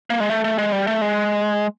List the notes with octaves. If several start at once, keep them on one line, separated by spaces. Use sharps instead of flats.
A#3
G#3
A3
A3
G#3
G3
A3
G#3